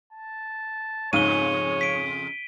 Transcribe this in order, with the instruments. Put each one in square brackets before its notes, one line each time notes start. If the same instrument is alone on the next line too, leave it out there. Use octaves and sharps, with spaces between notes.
[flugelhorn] A5
[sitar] F2 C#3 [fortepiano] G#2 F5 [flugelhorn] C#5 [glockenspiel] D#7 G7
[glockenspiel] B6 D7